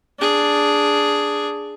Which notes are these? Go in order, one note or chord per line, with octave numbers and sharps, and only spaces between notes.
D4 G#4